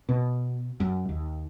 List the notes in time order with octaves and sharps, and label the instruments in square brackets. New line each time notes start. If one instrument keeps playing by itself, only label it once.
[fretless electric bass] B2
F#2
D#2